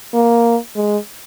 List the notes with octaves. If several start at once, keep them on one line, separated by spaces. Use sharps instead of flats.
A#3
G#3